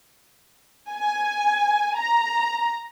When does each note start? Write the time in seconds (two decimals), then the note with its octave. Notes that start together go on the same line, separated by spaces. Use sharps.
0.91 G#5
1.98 A#5